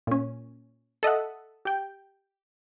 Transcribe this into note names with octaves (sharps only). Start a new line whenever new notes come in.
A#2 C#4
A4 D#5 E5 F#5
G4 G5